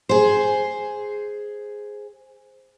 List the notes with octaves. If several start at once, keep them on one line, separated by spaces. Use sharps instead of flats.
G#4 C5